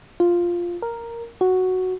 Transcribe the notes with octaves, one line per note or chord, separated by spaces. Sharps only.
F4
A#4
F#4